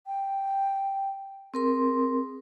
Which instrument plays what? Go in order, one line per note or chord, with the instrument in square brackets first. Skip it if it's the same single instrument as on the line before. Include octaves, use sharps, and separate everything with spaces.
[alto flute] G5
[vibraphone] C4 A#4 C6 [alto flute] G#4